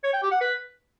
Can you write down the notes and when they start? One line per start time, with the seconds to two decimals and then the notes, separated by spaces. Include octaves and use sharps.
0.04 C#5
0.13 G5
0.22 G4
0.31 F#5
0.41 B4